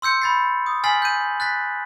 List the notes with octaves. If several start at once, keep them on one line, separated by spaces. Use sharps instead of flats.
C6 E6 G6 C#7
B5 A6 C7
D#6
G#5 F6 A6 B6 C7 F#7
G6 D#7
F#6 A6 B6